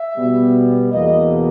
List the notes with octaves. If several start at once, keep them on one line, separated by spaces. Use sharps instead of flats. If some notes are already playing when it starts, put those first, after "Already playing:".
Already playing: E5
B2 G3 B3
E2 B2 A#3 D#5